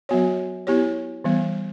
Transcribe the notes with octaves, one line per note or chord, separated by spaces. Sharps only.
F#3 B3 F#4 C#5
B3 E4 G4 C#5
E3 G3 B3